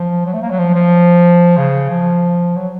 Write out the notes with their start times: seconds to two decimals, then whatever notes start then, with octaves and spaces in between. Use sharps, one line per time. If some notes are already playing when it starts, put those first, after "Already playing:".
Already playing: F3
0.26 F#3
0.34 A3
0.42 A#3
0.50 F#3
0.58 F3
0.75 F3
1.57 C#3
1.90 F3
2.56 F#3